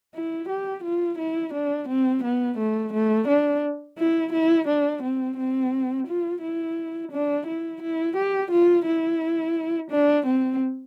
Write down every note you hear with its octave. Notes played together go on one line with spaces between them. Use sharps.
E4
G4
F4
E4
D4
C4
B3
A3
A3
D4
E4
E4
D4
C4
C4
F4
E4
D4
E4
E4
G4
F4
E4
D4
C4